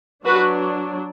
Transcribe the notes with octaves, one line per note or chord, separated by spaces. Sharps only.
F#3 D4 F#4 B4